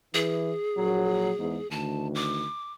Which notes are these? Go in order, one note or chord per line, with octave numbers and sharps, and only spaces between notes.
E3 G#4
A#1 F#3
E2 G#2
D2 D#3 A5
D6